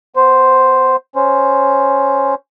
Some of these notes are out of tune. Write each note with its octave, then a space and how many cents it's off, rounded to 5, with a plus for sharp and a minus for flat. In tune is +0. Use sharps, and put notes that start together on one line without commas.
B3 +15 C5 +0
C#4 +0 C5 +0